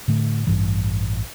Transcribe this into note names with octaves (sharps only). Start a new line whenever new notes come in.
A2 D3 A3
A1 G2 E3 G3